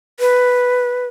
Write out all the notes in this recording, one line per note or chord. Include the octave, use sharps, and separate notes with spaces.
B4